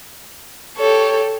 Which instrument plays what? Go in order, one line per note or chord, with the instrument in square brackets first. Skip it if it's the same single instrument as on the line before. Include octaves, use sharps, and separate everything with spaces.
[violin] G4 A4 [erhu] C#5